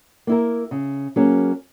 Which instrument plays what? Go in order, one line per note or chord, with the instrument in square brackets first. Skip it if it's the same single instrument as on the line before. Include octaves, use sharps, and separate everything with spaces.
[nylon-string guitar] A#3 E4 A#4
C#3
F#3 A#3 C#4 G#4